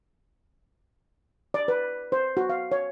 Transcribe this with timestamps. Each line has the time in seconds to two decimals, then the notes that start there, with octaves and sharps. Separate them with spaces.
1.54 D5
1.68 B4
2.12 C5
2.37 F#4
2.49 F5
2.72 C#5